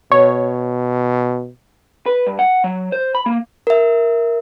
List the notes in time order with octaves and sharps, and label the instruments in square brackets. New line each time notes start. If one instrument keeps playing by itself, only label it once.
[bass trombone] B2 [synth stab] C#5
[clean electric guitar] B4
G2
F#5
F#3
C5
B5
A#3
[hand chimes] A#4 E5